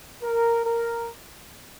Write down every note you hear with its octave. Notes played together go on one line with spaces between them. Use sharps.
A#4
A#4